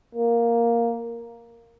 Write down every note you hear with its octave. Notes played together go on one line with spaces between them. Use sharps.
A#3